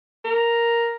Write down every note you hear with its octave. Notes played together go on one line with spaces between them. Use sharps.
A#4